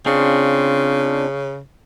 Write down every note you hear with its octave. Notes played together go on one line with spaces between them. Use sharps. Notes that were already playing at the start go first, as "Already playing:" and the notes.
C#3 C4 D4 F4